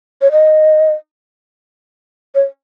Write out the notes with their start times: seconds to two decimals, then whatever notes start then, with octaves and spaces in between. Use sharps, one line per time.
0.22 C#5
0.31 D#5
2.35 C#5